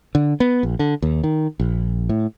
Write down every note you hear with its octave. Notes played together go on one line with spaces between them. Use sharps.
D3
B3
A#1
D3
D#2
D#3
A#1
A2